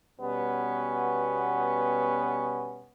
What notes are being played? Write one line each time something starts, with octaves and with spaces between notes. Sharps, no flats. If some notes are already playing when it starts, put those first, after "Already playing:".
B2 G3 B3 C#4 F#4